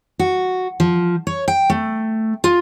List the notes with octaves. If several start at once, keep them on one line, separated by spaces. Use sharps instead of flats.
F#4
F3
C#5
G5
A3
F4